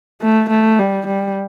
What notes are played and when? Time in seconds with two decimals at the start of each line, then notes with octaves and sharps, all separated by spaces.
0.22 A3
0.50 A3
0.79 G3
1.07 G3